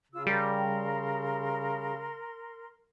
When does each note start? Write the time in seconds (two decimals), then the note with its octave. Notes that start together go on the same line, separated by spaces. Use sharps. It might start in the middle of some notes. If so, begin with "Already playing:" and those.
0.12 C#3 F4 E6
0.27 G3 A#4 C6